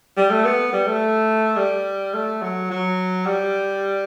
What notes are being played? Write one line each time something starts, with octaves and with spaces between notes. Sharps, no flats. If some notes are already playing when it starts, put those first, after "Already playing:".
G3
A3
B3
G3
A3
G3
A3
F#3
F#3
G3